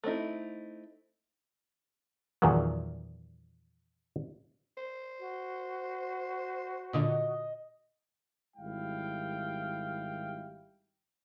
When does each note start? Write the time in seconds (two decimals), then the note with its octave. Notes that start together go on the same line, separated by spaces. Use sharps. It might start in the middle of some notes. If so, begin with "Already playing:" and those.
0.04 A3 C4 D#4 E4
2.42 E2 A#2 D#3 F3 F#3
4.77 C5
5.19 F#4
6.93 A#2 D3 D#5
8.57 G#1 G3 E4 F5 G5